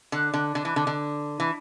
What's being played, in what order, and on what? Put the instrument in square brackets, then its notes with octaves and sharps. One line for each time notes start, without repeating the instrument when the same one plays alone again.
[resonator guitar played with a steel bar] D3
D3
D3
E3
D3
D3
E3